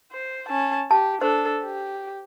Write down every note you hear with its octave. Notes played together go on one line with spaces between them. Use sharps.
C5
C#4 A5
G4 A5
D4 A4 C5
G4